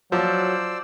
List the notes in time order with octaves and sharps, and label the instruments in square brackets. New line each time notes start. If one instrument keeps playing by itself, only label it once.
[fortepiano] F3 [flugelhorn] F#3 [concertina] C5 D5 E6